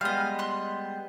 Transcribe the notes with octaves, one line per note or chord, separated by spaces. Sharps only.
G3 G#3 B3 D#5 F5
C6 F#6